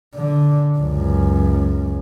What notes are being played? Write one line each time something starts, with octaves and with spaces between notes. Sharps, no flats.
D3
C#2 F#2